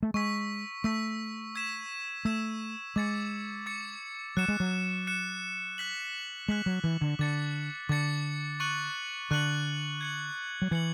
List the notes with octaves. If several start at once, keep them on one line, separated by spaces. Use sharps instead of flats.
A3
G#3 C#6 E6 B6
A3 C#6 E6 B6
E6 G#6 B6 E7
A3 E6 G#6 B6 E7
G#3 D6 A6 C#7
D6 A6 C#7
F#3 F#6 C#7 E7
G#3
F#3
F#6 C#7 E7
F#6 B6 F#7
G#3 F#6 B6 F#7
F#3
E3
D3
D3 D6 A6 C#7
D3 D6 A6 C#7
C#6 F#6 C#7 F#7
D3 C#6 F#6 C#7 F#7
G#6 C#7 F#7
F#3
E3 G#6 C#7 F#7